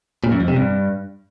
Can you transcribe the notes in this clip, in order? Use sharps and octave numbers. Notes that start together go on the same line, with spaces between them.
A#2
F#2
F2
C3
G2